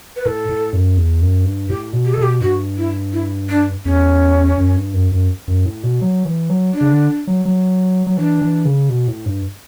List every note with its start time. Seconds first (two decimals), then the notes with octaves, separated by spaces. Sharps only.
0.16 B4
0.25 A2 A4
0.49 A2
0.73 F#2
0.97 E2
1.22 F#2
1.45 G2
1.69 A2 G4
1.93 B2
2.06 G4
2.14 A4
2.17 B2 G4
2.41 G2 F#4
2.78 E4
3.13 E4
3.49 D4
3.85 E2 C#4
4.58 F#2
4.76 G2
4.94 F#2
5.12 F#2
5.48 F#2
5.65 A2
5.83 B2
6.01 F#3
6.25 E3
6.50 F#3
6.73 D4
6.81 C#3
6.92 D3
7.27 F#3
7.45 F#3
8.07 F#3
8.17 E3 D4
8.42 E3
8.65 C#3
8.89 B2
9.08 A2
9.26 G2